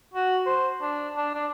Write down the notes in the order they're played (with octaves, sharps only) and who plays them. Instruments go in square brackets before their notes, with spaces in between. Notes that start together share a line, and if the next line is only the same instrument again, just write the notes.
[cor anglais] F#4
C5
D4
D4
D4